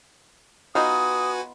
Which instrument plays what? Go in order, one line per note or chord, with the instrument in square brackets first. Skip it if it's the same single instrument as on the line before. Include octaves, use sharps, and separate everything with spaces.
[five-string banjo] B3 D#4 F4 [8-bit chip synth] F#4 B4 G#5 [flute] D#6